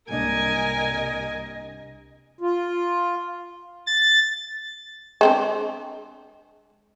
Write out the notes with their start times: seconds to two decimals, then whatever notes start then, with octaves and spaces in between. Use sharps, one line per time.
0.10 C2 G#2 A#3 D4 A#4 D#5 G#5
2.41 F4
3.87 A6
5.21 G#3 C4 D4